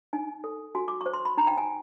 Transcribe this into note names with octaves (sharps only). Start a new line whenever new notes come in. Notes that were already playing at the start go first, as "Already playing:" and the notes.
D#4 G#5
A4
F#4 G#5
D6
C#6
C5
C6
B5
D#4 A#5
G5
G#5